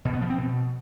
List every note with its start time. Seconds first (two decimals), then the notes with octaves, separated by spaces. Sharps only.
0.05 B2
0.13 B3
0.21 F3
0.30 C4
0.38 B2